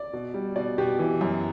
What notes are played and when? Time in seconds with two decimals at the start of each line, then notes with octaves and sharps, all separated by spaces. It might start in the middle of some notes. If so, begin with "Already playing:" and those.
Already playing: D5
0.13 B2
0.34 G3
0.56 B2 D5
0.78 B2 G4
0.99 E3
1.21 F#2